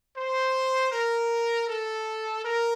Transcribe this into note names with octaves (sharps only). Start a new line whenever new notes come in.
C5
A#4
A4
A#4